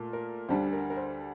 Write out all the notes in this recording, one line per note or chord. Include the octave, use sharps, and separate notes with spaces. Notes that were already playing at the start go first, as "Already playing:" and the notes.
Already playing: A#2 A3
A#4
D2 D3 G3 D4 C5
A#4
A#4
C5